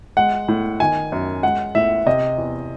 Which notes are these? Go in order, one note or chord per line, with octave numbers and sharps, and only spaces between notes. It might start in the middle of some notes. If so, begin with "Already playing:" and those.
G#3 F#5
A2
D#3 G#5
F#2
G#3 F#5
A2 E5
C3 D#5
E2